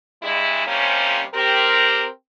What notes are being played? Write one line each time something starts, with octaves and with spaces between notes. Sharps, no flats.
G2 G#3 E4
C3 F3 G3 A#3 C#4
C4 G4 A#4